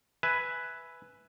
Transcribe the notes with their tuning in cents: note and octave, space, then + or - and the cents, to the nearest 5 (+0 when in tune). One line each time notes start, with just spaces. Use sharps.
B4 +0 E5 +0 G#5 +10